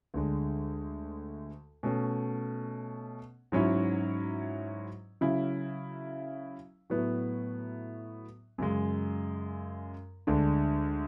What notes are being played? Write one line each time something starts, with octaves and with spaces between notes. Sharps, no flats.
D2 D3 G#3
B2 A3 C#4
G#2 F#3 C#4 E4
C#3 F#3 C#4 E4
A2 F#3 B3 E4
F#2 C#3 G#3
D2 D3 G#3 D4